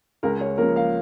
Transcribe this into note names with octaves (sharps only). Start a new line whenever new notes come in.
C#2 A#4
C#5
C#3 F3 A#3 A#4
F5